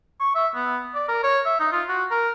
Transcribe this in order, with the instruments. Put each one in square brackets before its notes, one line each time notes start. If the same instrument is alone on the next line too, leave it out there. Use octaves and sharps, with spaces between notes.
[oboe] C#6
E5
B3
D5
A#4
C#5
E5
D#4
F4
F#4
A#4